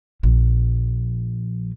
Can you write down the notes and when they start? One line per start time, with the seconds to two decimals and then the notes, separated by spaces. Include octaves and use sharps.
0.23 A#1 F3